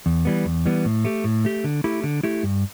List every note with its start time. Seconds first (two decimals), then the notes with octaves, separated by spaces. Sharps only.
0.06 E2
0.25 E3 G3 B3
0.45 E2
0.66 E3 G3 B3
0.85 A2
1.05 A3 G4
1.24 A2
1.45 A3 G4
1.64 D3
1.84 A3 E4 G4
2.04 D3
2.23 A3 E4 G4
2.43 G2